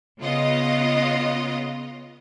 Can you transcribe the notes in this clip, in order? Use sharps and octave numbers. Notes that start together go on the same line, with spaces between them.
C#3 B3 F4 D#5